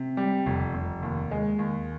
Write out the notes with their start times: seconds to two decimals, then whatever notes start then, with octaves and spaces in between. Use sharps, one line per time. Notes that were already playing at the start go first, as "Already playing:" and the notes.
Already playing: C3
0.17 G3
0.46 F1
0.74 F1
1.03 D#2
1.31 G#3
1.59 D#2